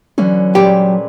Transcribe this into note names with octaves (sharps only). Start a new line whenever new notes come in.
D3 E3 F#3 C#4
A#2 G3 G#3 G4